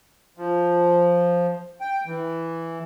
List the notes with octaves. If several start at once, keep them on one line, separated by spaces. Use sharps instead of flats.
F3
G5
E3